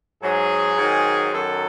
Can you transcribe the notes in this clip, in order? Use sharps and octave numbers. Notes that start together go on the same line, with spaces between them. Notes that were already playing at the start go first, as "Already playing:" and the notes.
G#2 F#3 G#4
G#2 D#3 F#3
F#2 D#3 F#3 A4